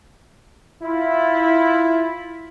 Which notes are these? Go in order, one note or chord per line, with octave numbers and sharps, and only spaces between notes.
E4 F4